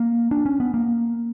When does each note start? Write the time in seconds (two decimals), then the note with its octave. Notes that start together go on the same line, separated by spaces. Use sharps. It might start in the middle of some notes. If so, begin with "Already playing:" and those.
Already playing: A#3
0.31 D4
0.46 C#4
0.60 B3
0.74 A#3